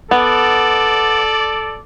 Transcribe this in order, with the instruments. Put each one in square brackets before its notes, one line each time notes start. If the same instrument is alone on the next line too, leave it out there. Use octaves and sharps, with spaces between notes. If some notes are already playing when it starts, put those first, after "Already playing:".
[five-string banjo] B3 [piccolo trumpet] A4 [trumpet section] D5